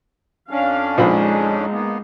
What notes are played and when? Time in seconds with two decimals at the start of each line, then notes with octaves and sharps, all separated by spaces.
0.51 F2 C#4 D4 F5
0.98 A#1 F3 G#3 D#4 B5
1.71 A#3 B3